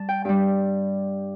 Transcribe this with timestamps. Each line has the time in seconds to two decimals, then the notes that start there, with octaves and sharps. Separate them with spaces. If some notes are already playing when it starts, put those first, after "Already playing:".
Already playing: G3 A5
0.09 G5
0.25 G2 G3 G5